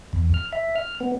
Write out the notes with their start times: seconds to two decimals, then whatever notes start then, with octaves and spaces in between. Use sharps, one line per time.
0.13 E2
0.34 F6
0.53 E5
0.76 F6
1.00 B3